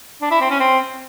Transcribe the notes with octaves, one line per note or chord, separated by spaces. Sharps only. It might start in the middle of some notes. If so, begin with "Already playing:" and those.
D4
E4
C4
C#4
C4